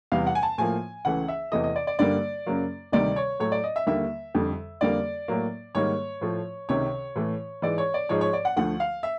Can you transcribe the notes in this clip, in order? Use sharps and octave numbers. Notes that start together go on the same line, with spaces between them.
E2 C3 E3 G3 F5
F#5
G#5
A5
A2 F3 A#3 G#5
C#2 C#3 E3 A3 F#5
E5
E2 C3 E3 A3 D#5
D#5
D5
D5
G2 D3 G3 A#3 D5
F#2 C#3 F#3 A#3
D2 C3 D#3 G3 D5
C#5
A2 F#3 A3 C#5
D5
D#5
E5
D#2 D3 G3 A#3 E5
F2 D3 G3
F2 D3 G3 A#3 D5
A2 F#3 A#3
G#2 D#3 G3 A#3 C#5
A2 F3 A3
C#2 C3 D#3 C#5
A2 E3 A3
G#2 E3 G#3 D5
C#5
D5
G#2 F3 G#3 C#5
C#5
D5
F#5
D2 D3 F3 A3 F#5
F5
E5